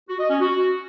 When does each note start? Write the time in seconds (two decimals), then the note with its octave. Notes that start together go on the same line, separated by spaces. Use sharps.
0.09 F#4
0.19 D#5
0.30 C#4
0.40 F#4